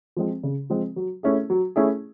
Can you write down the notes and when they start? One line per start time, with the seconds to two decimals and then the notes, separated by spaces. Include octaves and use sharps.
0.17 F3 G#3 C4
0.43 C#3
0.70 F3 G#3 C4
0.96 F#3
1.23 A3 C#4 E4 G#4
1.50 F#3
1.76 A3 C#4 E4 G#4